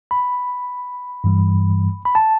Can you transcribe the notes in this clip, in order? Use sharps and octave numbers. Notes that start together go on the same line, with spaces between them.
B5
G2 E3 G3
B5
A5